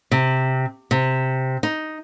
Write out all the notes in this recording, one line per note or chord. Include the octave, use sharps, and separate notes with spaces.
C3
C3
D#4